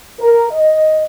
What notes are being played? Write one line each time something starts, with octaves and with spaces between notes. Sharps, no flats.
A#4
D#5